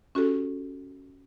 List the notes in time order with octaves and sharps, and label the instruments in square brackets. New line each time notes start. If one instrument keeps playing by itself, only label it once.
[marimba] C#4 F#4 G4 A4